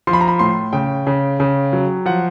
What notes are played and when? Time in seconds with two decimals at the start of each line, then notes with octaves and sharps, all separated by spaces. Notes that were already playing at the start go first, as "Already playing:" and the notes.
0.07 F3 C6
0.13 B5
0.21 A#5
0.28 B5
0.39 A2 C6
0.73 C#3 G5
1.07 C#3
1.40 C#3
1.73 F#3
2.06 F3 F#5